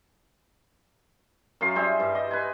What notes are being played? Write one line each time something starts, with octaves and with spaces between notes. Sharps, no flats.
F#2 F5 C6
G3 G#4 C5 E5
G2
D#5
B4 G#5